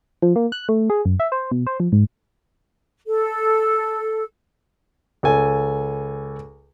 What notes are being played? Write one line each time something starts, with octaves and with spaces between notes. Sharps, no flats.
F3
A#3
F#6
A3
G#4
F#2
E5
C5
B2
C5
F3
G#2
A4
C#2 A4 G#5